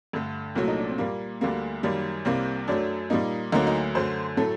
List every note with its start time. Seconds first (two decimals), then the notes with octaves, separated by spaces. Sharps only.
0.13 G2 D3 A3
0.55 C2 A#2 F#3 A3 F#4
0.68 D#4
0.78 D4
0.88 C4
0.98 A#2 G3 A#3
1.41 D2 D3 G3 A#3
1.83 F#2 D#3 G3 A#3
2.25 C2 C3 G3 A#3 C4
2.68 F#2 F#3 A3 D4
3.10 A#2 G3 A#3 D#4
3.52 D2 D3 F#3 A#3 D#4
3.67 D#4
3.95 F#2 D3 A3 C5
4.37 A2 F#3 A3 A4